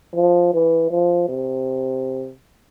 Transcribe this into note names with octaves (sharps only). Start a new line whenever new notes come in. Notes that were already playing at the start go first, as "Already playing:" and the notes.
F3
E3
F3
C3